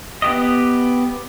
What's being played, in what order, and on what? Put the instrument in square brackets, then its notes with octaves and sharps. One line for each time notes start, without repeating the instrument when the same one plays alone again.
[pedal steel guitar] B3 G4 D#5